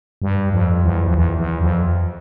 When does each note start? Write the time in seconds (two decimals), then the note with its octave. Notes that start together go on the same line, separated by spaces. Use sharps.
0.22 G2
0.52 F2
0.83 E2
1.07 F2
1.15 E2
1.38 E2
1.61 F2